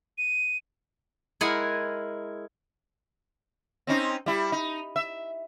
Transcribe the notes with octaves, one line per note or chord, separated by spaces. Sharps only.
D#7
G#3 E4 G#4 A#4 F#5 G#5
C4 C#4 D#4
G3 E4
D#4
E5